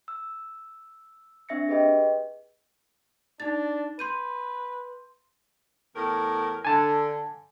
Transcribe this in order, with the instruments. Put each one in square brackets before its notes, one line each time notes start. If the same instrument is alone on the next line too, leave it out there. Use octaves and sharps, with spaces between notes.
[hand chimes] E6
C4 D4 E5 A#6 C#7
G4 G#4 B4 D#5 G5
[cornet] D4 [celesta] D#4 A6
[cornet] B4 [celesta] C6 G6 D#7
[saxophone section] E2 A2 A#4
[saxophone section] D3 [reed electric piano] G#5 A5